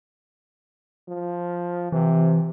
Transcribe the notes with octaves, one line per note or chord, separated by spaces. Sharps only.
F3
C3 E3